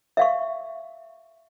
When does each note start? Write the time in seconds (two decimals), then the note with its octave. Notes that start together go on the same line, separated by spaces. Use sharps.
0.17 E5 F5 C#6